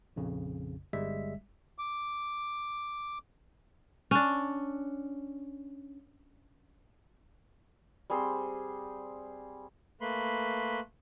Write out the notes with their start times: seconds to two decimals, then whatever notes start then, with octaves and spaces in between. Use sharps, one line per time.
0.16 A#1 F2 C#3
0.93 G1 G3 G#3 E5 B6
1.78 D6
4.11 C#4 D4
8.10 G3 C4 G#4 C5
10.01 A3 A#3 B4 B5 C6